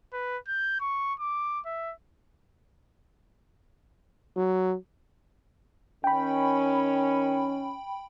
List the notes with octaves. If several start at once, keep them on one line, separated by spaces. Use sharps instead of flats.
B4
G6
C#6
D6
E5
F#3
D#3 C#4 G5 B5